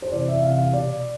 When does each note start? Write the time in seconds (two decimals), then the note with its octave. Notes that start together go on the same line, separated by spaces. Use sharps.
0.02 C5
0.12 C3 E3 D5
0.28 E5
0.43 C3 E3 F5
0.58 F5
0.73 B2 D5